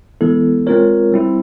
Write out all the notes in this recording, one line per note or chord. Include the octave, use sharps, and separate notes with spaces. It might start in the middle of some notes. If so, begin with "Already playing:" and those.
E3 G#3 B3 E4 A4
G#3 C4 F4 A#4 C#5
G3 C4 E4